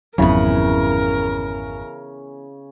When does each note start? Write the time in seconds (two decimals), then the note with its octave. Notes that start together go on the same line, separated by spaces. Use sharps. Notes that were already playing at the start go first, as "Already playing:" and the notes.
0.18 G#1 F2 C#3 E3 F#3 B3 A#4